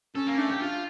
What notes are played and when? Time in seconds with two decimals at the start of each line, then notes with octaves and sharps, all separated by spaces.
0.15 C#4 A4
0.27 A#3
0.38 A3 D4
0.49 G4
0.61 F4